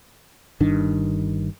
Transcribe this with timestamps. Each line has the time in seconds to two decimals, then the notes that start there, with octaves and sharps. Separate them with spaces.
0.60 G1 G2 D#3 D4